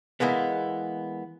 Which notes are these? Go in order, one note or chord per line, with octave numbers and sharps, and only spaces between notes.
E3 G#3 A#3 B3